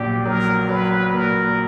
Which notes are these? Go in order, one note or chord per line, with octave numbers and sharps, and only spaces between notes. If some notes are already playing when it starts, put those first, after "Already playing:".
Already playing: A#1 A#2 F#3 G4
F#3 A#4
F#3 B4
A#2 A#4